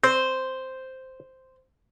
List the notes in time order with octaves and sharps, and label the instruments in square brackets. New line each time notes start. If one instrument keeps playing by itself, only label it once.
[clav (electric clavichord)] C4 [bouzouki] C5